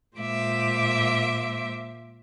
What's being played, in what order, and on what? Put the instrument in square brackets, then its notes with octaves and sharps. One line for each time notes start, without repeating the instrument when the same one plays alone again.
[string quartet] A#2 G#3 A#3 C5 E5 D6